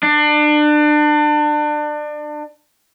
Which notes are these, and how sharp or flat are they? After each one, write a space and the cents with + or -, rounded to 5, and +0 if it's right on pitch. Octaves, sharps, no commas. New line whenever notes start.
D4 +30